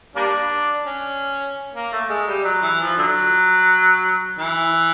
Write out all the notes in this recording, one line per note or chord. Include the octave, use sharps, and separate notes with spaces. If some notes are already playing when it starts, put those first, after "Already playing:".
G3 A#3 D4
C#4
A#3
A3
G#3
G3
F#3
E3
F3
D3 F#3
E3